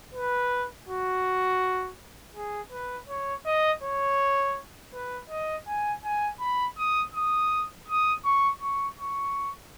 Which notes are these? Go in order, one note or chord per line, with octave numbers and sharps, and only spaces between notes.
B4
F#4
G#4
B4
C#5
D#5
C#5
B4
D#5
G#5
G#5
B5
D#6
D#6
D#6
C#6
C#6
C#6